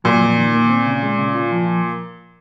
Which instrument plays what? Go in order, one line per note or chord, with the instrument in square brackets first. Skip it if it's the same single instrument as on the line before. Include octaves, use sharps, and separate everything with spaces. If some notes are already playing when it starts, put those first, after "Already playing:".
[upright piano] A#2 [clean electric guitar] F#3
[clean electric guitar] F2
D#3
A#3
C4
C#3
G#3
C#3
F4
F3